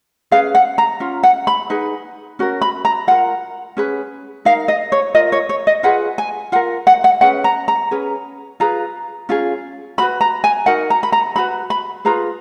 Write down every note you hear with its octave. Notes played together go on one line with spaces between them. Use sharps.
C#4 G#4 B4 F5
F#5
A#5
C#4 F4
F#5
B5
D#4 G#4 B4
C#4 F#4 A#4
B5
A#5
F4 A#4 F#5
C#4 G#4 B4
D#4 A#4 F5
D#5
C#5
F4 A#4 D#5
C#5
C#5
D#5
F4 G#4 B4 F#5
G#5
F4 A#4 F#5
F#5
F#5
C#4 G#4 B4 F#5
A#5
A#5
C#4 G#4 B4
F4 G#4 B4 A#5
C#4 F4 G#4
C#4 F#4 B4 B5
A#5
G#5
D#4 F#4 A#4 F#5
A#5
B5
A#5
D#4 F#4 B4 B5
B5
F4 G#4 B4 A#5